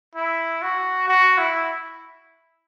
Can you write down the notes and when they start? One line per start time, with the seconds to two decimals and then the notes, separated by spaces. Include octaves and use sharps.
0.15 E4
0.62 F#4
1.08 F#4
1.38 E4